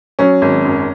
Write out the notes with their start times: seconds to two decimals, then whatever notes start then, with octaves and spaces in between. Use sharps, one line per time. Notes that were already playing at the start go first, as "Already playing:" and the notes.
0.19 F#3 C#4
0.42 G#1
0.65 F#2